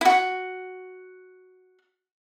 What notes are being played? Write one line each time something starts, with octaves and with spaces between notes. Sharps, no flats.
E4 F#4